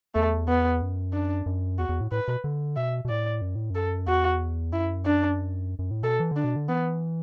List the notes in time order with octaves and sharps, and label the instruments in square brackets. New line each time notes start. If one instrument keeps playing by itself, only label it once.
[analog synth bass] E2 [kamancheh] A3
[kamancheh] B3
[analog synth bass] F#2
[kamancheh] D4
[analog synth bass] F#2
[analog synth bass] E2 [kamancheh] F#4
[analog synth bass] E2
A2
[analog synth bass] A2 [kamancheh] B4
[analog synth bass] B2
D3
[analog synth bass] B2 [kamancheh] E5
[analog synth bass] B2
[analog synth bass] A2 [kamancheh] D5
[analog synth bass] F#2
A2
[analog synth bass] F#2 [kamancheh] A4
[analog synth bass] E2 [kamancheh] F#4
[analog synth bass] F#2 [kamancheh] E4
[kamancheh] D4
[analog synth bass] F#2
A2
[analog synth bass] B2 [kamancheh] A4
[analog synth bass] E3
[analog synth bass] D3 [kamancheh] D4
[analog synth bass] B2
D3
[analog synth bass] E3 [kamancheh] B3